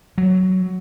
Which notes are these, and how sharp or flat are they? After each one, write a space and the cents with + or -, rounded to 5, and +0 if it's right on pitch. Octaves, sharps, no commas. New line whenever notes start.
F#3 +10